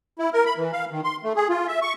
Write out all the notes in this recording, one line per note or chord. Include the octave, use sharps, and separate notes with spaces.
E4
A#4
B5
E3
F5
D#3
C6
A3
G#4
F4
E5
C#6